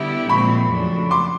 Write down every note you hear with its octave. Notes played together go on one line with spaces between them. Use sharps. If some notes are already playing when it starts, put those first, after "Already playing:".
Already playing: D3 G3 B3 E4 G4
A#2 F3 G#3 C4 B5 C#6
F2 C#3 F#3 A3 D4
C6 D6